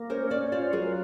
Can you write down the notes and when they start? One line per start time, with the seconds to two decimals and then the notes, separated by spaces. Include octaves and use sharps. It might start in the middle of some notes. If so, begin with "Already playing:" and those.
Already playing: A#3
0.10 C#4 A#4 C5
0.30 C#4 C5 D5
0.52 F4 C5 D5
0.73 F#3 G#4 A#4